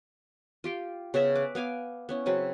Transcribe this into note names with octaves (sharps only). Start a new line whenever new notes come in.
F4 G4 G5
C#3 B3 C#4 E5
B4 D6
B3 F5 G#5 D6
B3 C#4 E4
C#3 F#3 C4 B4